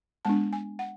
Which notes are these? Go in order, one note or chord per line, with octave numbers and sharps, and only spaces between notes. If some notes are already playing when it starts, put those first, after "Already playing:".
G#3 B3 D4 A5
G#5
F#5